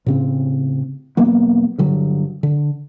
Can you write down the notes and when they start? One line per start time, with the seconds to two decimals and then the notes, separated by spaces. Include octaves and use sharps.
0.06 A2 C#3 C4
1.17 E1 F#3 A#3 B3
1.78 G2 D3 F#3
2.43 D3